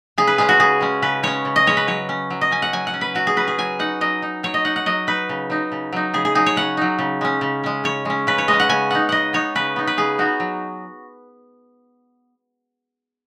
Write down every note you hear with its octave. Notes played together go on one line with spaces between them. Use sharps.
C#3 G#4
B4
G#3 C#4 G#4
F#4
C#3 G#4
G#3 C#4
C#3 B4
G#3 C#4 C#5
C#3
D#5
G#3 C#4 C#5
B4
F#3 C#5
C#4
F#3
D#5
C#4 G#5
F#5
F#3 G#5
F#5
C#4
B4
F#3 F#4
G#4
C#4 B4
G#4
F#3 G#5
D#4 F#5
F#3 D#5
D#4
F#3 C#5
D#5
D#4 F#5
F#5
F#3 D#5
D#4 B4
C#3
F#3 D#4
C#3
F#3 D#4
C#3 G#4
G#4
F#3 D#4 G#4
C#5
C#3 F#5
F#3 D#4
C#3
G#3 C#4
C#3
G#3 C#4
C#3 C#5
G#3 C#4
C#3 B4
C#5
G#3 D#5
C#4
F#5
C#3 G#5
B3 D#4 F#5
C#3 D#5 F#5
B3 D#4 C#5
C#3 B4
B3 D#4
B4
C#3 G#4
B3 D#4 F#4
F#3